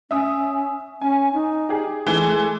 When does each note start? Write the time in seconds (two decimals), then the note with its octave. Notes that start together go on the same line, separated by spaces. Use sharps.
0.11 C#4 E5 D#6
1.01 C#4 G#5
1.33 D#4
1.69 G4 G#4
2.07 E3 G#3 A3